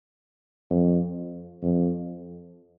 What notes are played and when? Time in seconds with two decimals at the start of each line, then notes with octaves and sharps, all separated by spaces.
0.70 F2
1.62 F2